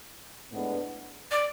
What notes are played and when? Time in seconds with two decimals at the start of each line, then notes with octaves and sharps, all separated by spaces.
0.50 A2 G#3 B3 D4
1.31 D5